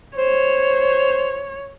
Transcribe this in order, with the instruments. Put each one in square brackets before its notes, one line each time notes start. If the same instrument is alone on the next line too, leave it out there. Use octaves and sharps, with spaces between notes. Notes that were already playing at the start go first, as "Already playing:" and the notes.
[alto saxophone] C5 [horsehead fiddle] C#5